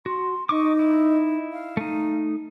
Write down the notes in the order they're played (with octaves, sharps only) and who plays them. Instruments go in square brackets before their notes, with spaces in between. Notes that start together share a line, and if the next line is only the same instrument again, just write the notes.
[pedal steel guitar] F#4 [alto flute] C6
[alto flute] D#4 [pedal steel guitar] D#5 C#6 D6
[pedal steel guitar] E4
[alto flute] F5
[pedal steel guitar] A3 D#4